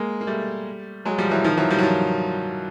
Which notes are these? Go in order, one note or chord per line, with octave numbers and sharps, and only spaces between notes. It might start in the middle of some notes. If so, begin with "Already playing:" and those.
Already playing: G#3 A#3
A#3
G3 A3
F#3 G#3
F3 G3
E3 F#3
D#3 F3
E3 F#3
F3 G3
F#3
D#3 F3